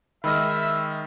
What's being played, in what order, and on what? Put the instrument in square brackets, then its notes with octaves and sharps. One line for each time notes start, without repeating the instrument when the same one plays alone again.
[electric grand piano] D#3 G#3 D#5 [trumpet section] E5 [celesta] B5 E6 F6